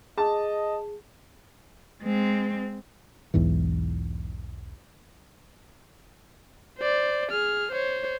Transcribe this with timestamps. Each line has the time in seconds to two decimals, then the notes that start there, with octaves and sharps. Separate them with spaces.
0.18 G#4 D#5 A5
2.02 G#3 C4
3.34 B1 E2 G#2 E3
6.79 C5 D5
7.31 G#4 F6
7.72 C5 C#5